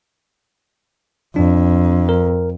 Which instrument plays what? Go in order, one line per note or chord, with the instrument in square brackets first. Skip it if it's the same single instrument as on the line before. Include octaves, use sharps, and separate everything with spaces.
[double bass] F2 [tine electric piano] D4
[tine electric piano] A#4